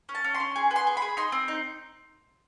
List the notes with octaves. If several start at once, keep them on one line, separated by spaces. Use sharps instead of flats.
C#4
A5
C#4
C6
C#4
G#4
B3
C6
G#4
B5
G#4
D#4 C6
C4
D#4